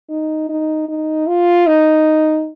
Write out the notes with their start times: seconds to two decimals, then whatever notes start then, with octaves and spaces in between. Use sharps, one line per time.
0.10 D#4
0.49 D#4
0.89 D#4
1.27 F4
1.67 D#4